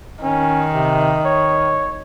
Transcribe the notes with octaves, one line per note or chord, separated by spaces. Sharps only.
D#3 C#4
C3
C#5